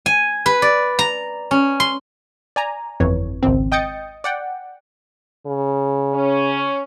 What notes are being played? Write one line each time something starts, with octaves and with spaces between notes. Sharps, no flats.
G#5
B4
D5
A#5
C#4
C6
D5 G#5 A#5
G1 F2 E3 C#5
G#1 C#2 C4
D#5 G5 D#6 G6 A6 C#7
D5 F#5 G5
C#3
C#4